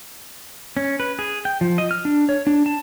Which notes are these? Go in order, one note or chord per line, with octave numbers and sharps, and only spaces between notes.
C#4
B4
G#4
G5
F3
D#5
F6
D4
C#5
D4
A5